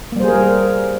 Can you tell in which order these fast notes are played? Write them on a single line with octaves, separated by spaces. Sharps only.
A#3 G3 C5 G#4 A#4